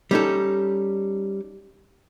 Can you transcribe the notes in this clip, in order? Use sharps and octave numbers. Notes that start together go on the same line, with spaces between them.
G3 C#4 D#4 A4